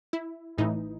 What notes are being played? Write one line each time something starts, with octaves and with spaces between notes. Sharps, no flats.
E4
A1 A2 E3 D#4